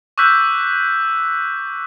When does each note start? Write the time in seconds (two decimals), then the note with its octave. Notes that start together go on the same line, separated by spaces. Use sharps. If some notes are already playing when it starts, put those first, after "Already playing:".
0.18 C#6 D6 E6 F#6 G6 B6